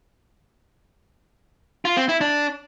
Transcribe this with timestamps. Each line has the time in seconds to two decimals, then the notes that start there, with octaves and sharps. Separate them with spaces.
1.85 F4
1.97 C4
2.09 E4
2.21 D4